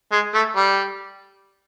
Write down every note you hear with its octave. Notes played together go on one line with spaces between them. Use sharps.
G#3
A3
G3